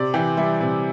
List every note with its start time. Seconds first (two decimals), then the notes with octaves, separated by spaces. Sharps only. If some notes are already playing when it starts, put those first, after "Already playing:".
Already playing: C3 D5
0.14 E3 G4
0.37 G3 E4
0.61 C3